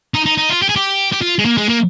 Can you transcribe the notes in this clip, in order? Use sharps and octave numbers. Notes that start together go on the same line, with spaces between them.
D#4
D#4
D#4
F4
G4
G#4
G4
G4
F4
G#3
A#3
G#3
A#3